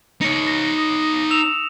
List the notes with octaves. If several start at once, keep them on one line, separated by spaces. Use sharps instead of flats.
D#4 C#5 C#7
A#6
D#6
E6 E7 F7